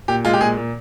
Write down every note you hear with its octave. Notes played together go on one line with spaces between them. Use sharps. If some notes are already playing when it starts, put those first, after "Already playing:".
A#2 G4
G#3 F4
G4
A#2 G#4
A#2